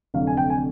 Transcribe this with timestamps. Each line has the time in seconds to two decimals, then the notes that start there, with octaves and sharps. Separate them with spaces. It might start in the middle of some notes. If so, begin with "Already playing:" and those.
0.14 F1 F2 D3 F#3 F5
0.27 G#5
0.37 G5
0.50 G#5